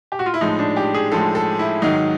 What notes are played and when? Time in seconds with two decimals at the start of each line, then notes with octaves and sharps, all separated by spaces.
0.12 G4
0.19 F#4
0.26 F4
0.34 E4
0.41 A2 F3 G#3 D#4
0.59 D4
0.77 G4
0.94 G#4
1.12 A2 F3 G#3 A4
1.35 A4
1.59 E4
1.82 G#2 D#3 F#3 D#4